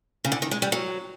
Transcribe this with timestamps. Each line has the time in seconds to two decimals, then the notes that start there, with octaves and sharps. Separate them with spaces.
0.25 C#3
0.32 D3
0.42 D#3
0.51 G#3
0.62 G3
0.72 F#3